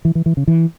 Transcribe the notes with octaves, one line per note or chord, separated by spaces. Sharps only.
E3
E3
E3
C#3
E3